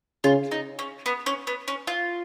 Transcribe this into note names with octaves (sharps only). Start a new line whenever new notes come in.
C#3 F4
D#4
C#4
B3
C#4
B3
C#4
F4